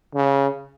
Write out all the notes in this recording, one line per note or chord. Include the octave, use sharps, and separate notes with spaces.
C#3